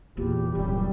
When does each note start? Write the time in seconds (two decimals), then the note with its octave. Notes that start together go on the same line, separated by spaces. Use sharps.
0.17 E2 A#2 G4
0.55 D#1 F#2 G3 G4